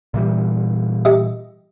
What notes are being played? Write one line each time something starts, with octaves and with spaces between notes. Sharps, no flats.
A#2 E3 G3
G4 D#5 E5